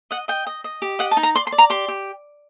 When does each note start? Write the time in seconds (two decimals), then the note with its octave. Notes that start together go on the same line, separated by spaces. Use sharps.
0.11 D#5 F#5
0.28 D#5 G5
0.47 D#5
0.64 D#5
0.82 G4
0.99 D#5 F#5
1.11 A5
1.17 D#4
1.23 A#5
1.35 D5 C6
1.47 C6
1.52 D5
1.58 A#5
1.70 G4 C6
1.88 G4